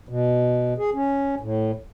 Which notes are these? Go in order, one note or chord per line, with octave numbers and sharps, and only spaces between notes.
B2
G#4
C#4
A2